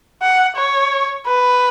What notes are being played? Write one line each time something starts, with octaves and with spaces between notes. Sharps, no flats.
F#5
C#5
B4